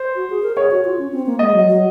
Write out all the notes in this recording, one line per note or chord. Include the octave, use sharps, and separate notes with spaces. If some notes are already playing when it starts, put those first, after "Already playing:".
Already playing: C5
F#4
G#4
A#4
G#4 C#5
F#4
F4
C#4
C4
A#3
G#3 D#5
F#3
F#3